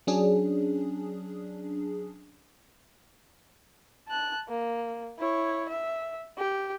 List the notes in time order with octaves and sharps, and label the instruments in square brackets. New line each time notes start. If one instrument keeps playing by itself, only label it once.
[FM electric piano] F#3 C#4 D4 G#4
[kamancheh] A5 F#6
A#3
E4 C#5
E5
G4